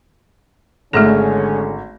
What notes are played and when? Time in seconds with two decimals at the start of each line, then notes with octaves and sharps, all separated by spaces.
0.93 G#1 D3 G#3 A3 C#4 G#4 A4 A#6